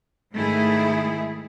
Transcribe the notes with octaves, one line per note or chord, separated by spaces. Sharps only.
G#2 D#3 A3 E4 G#4